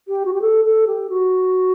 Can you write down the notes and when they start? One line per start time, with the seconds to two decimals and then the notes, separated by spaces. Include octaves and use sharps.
0.08 G4
0.25 F#4
0.33 G4
0.42 A4
0.65 A4
0.87 G4
1.10 F#4